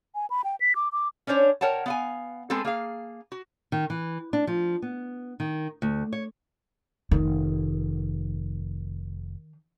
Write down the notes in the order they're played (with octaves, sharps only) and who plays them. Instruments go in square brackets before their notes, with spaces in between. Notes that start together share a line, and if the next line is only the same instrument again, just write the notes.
[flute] G#5
B5
G5
B6
D6
D6
[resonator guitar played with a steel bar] C#4 D4 C5 C#5
A#4 C#5 F#5 G5 A5
B3 F5 G#5
G#3 B3 C4 G#4 A4
A#3 G#4 F5
F#4
[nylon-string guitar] D#3
E3
D4
F3
B3
D#3
D2
C#5
[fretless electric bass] F1 [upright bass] D#3